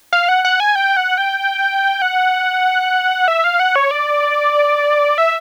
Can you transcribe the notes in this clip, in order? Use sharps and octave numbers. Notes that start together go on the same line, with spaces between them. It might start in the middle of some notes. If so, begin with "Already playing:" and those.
F5
F#5
F#5
G#5
G5
F#5
G5
F#5
E5
F5
F#5
C#5
D5
E5